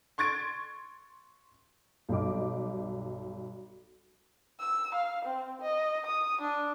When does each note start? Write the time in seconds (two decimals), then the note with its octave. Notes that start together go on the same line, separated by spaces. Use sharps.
0.18 C6 C#6 G#6 A6 D7
2.09 B1 G2 D#5 D6
4.60 E6
4.95 F5
5.25 C4
5.62 D#5
6.07 D#6
6.41 D4